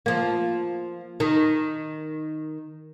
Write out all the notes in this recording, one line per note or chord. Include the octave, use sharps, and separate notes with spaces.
F3 A#3
D#3